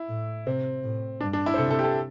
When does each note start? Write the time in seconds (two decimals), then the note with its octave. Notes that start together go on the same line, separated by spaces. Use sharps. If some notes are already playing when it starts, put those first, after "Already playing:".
Already playing: E4
0.09 A2
0.46 C3 C4
0.83 A2
1.21 G2 D4
1.33 D4
1.46 E4
1.54 C5
1.58 C3 A4
1.70 A4
1.79 G4
1.84 A4